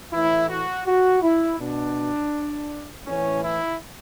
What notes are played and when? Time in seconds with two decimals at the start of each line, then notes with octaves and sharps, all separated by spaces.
0.13 A2 E3 E4
0.49 F#4
0.87 F#4
1.23 E4
1.59 B2 D4
3.07 A2 E3 C#4
3.44 E4